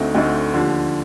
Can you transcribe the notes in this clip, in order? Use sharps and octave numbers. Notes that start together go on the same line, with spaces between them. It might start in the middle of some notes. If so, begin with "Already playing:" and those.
Already playing: D2 D3 A3 C4 D#4
D2 D3 A3 C4 D#4
D#2 D3 F3